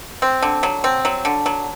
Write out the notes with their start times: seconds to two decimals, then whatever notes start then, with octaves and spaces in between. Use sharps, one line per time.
0.22 C4
0.42 D3
0.63 F#3
0.84 C4
1.05 F#3
1.25 D3
1.46 F#3